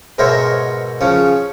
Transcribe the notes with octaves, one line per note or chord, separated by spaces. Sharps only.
G#2 B2 A#4 C5 C#5 E5
C#3 F3 C#4